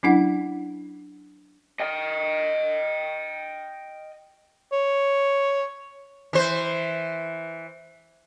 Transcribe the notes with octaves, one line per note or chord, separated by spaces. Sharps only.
F#3 C#4 D4 E4 F#5
D#5 G5
C#5
E3 C5